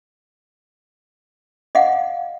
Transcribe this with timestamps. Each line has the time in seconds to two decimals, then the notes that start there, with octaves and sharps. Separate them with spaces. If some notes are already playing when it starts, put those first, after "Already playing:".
1.75 D#5 F5 F#5